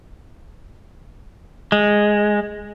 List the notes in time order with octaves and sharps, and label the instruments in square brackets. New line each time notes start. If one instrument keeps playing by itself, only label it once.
[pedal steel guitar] G#3